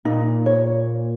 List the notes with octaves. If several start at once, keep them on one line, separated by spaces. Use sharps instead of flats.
A#2 D#4
C#5